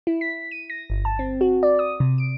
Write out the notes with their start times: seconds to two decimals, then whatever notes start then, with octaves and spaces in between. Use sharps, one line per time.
0.07 E4
0.21 B6
0.51 D#7
0.70 A#6
0.90 G1
1.05 A5
1.19 C4
1.41 F#4
1.63 D5
1.79 D#6
2.00 C3
2.18 D7